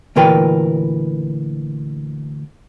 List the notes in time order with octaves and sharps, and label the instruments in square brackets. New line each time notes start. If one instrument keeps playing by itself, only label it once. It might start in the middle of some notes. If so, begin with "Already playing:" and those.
[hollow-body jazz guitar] D2 A#2 E3 A#4 B4 G5